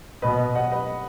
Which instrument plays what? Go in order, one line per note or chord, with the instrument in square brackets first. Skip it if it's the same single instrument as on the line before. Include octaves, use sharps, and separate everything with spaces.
[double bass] B2 [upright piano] B4 D#5
[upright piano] D#5 F#5
B4 D#5